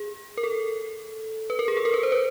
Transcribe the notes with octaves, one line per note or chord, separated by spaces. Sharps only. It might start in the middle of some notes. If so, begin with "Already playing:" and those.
Already playing: G#4
A#4
A4
B4
A#4
G#4
A4
A#4
B4
C5
B4